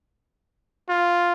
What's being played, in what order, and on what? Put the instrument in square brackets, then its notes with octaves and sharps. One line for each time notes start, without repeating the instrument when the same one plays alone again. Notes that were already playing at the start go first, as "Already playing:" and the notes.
[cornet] F4